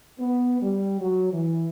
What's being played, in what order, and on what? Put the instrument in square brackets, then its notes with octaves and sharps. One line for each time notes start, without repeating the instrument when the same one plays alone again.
[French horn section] B3
G3
F#3
E3